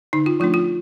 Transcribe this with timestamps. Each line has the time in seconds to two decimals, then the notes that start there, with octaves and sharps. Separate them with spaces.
0.13 D3 D#4
0.26 F4
0.40 F3 A3 D4 F4
0.54 F4